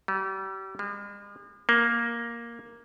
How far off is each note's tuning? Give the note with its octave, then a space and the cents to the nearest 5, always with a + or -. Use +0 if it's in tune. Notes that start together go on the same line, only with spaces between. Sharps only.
G3 -35
G#3 -45
A#3 +5